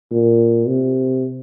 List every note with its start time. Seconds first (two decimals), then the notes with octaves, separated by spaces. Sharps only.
0.11 A#2
0.68 C3